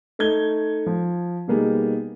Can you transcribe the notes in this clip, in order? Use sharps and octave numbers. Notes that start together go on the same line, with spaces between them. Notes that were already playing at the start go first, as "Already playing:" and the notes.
A3 D#4 G#6 G7
F3
B2 G3 A#3 B3 D#4 G#4